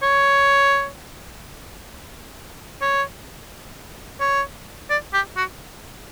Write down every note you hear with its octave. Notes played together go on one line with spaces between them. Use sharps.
C#5
C#5
C#5
D5
G4
F#4